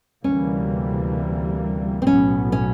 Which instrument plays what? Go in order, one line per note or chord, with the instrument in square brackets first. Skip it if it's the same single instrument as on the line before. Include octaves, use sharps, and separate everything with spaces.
[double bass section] D2 C3 E3 G3 A#3 [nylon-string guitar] C#4
[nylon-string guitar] C4
[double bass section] B1 A2 F#3 B3 [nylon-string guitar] C#4
[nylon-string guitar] C#4